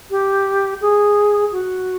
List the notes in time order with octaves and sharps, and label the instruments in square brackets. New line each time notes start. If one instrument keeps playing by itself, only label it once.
[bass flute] G4
G#4
F#4